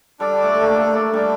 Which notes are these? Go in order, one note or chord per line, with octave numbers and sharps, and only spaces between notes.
G3 D4 A4 D5
A3
A3
A#3
A3
G3 D4 A4 D5